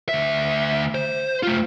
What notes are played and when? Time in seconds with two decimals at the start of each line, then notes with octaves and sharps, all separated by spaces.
0.09 D2 E5
0.95 C5
1.43 A3 F4